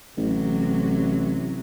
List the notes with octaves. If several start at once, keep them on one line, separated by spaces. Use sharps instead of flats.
A1 C3 F#3